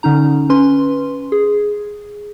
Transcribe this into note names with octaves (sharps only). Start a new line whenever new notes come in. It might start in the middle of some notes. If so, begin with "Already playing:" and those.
D3 C#4 D#4 A#5
C#4 B4 C6
G#4